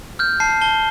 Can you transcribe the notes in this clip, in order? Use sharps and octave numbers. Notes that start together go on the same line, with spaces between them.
F6 G6
A5 C7
A5 G7